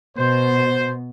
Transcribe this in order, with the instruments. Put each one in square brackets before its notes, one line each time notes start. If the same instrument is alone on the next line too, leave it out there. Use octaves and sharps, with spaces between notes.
[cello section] B2 [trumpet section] C5